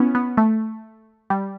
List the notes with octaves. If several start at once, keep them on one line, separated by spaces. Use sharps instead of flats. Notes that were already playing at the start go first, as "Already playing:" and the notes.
Already playing: B3 C#4 E4
B3
A3
G3